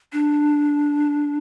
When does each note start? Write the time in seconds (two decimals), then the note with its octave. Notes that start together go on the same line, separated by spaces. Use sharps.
0.13 D4